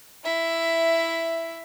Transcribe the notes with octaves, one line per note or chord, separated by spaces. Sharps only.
E4 E5